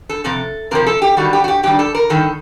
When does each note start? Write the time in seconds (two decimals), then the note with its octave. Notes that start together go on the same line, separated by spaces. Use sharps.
0.09 A4
0.24 F2 C3 A4
0.71 F2 C3 F3 A#4
0.87 A4
1.02 G4
1.17 G2 D#3 G3 F#4
1.33 G4
1.44 F#4
1.48 G4
1.63 G2 D#3 G3 G4
1.79 A4
1.95 A#4
2.10 G2 D#3 A4